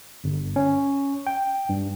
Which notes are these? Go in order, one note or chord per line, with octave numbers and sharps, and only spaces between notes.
G1
C#4
G5
G2